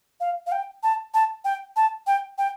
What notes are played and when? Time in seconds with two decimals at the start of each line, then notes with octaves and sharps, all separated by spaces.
0.20 F5
0.47 F5
0.52 G5
0.83 A5
1.14 A5
1.45 G5
1.76 A5
2.07 G5
2.38 G5